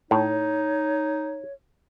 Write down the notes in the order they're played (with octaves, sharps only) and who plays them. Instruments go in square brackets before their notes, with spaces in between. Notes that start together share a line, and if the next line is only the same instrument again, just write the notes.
[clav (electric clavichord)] A2 [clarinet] D#4 [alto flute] C#5